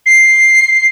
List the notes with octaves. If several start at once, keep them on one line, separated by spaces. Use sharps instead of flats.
C7